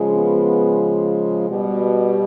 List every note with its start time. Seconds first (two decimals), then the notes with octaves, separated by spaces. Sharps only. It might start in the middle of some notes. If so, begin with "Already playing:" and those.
Already playing: C#3 F3 G#3
0.12 B3
1.49 B2 G3